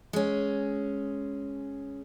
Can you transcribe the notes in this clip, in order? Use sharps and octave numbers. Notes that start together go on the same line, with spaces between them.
G#3 C#4